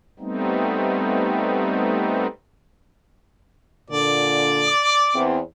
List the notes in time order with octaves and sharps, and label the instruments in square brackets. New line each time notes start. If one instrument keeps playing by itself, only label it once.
[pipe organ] G3 A3 B3 C4 D#4
[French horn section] A#2 D3 [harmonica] D5
[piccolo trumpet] D6
[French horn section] E2 C4